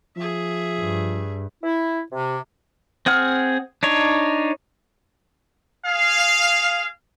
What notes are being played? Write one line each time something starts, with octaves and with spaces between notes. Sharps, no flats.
F3 G#4 E5
G2
E4
C3
C4 G#4 F#5 F6
D4 D#4 C#5
G#4 F5